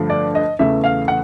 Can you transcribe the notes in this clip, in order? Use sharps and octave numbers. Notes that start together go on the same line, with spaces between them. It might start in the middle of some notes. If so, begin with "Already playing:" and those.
Already playing: G2 D3 F3 A3
D5
D#5
E2 C#3 E3 A3 E5
F5
F#5